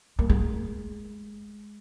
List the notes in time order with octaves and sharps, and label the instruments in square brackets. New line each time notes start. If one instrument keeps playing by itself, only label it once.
[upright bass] A#3
G#3